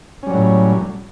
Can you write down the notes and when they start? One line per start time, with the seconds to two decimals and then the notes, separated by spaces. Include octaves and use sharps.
0.23 C#4
0.26 G3
0.30 F#3
0.33 A2